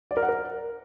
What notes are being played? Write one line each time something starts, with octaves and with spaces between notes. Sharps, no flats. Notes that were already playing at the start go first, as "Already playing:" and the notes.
D5
A#4
F#5
A#4